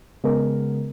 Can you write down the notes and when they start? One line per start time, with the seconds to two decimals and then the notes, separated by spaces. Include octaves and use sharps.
0.24 C#3 G#3 B3 A#4